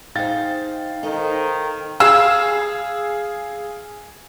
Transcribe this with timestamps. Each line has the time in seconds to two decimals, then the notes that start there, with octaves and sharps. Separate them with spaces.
0.15 D#4 G#4 C5 F5 G5 A6
1.03 D#3 D#4 A4 C5
2.00 G#4 F5 E6